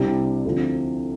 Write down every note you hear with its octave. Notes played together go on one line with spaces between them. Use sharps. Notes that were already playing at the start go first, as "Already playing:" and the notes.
Already playing: C2 C3 G3 D4
D2 C3 F3